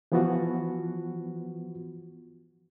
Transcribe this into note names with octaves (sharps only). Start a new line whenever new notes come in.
E3 F3 B3 F4 F#4